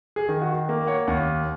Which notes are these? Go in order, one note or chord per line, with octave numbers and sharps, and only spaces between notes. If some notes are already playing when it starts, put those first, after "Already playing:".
G#4
D#3
F#4
A#3
C#5 F#5
D#2 C#5 F#5